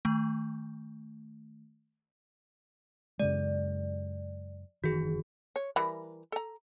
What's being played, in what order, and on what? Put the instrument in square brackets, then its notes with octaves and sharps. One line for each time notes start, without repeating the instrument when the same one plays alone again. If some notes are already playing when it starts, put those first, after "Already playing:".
[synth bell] D#3 A3
[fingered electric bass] F#2 C#3 G#3 [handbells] D5
[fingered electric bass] F#1 D#3 E3 [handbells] F#4 G#4
[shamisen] C#5
E3 G3 A#4
A4 A#5